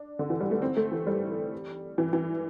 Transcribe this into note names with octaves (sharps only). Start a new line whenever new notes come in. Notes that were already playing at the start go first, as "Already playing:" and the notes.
Already playing: D4
D3
E3
G3
A3
C4
A3
E3
G3
E3
E3